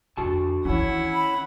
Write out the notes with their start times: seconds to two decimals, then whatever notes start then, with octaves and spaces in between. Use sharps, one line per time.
0.17 F2 D3 F#4 A5
0.65 D#3 E3 C#4 E4 C#5 F#5
1.13 B5